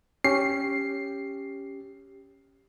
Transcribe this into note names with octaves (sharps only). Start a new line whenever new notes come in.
C#4 G4 C7